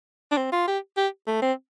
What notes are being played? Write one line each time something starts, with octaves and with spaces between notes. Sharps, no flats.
D4
C4
F4
G4
G4
A3
C4